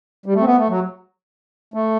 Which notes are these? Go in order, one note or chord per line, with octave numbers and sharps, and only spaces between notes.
G3
A3
C4
B3
A3
F#3
A3